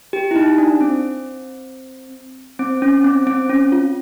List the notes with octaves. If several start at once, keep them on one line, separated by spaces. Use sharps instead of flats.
G4
E4
D#4
D4
C4
C4
C#4
C4
C4
C#4
F4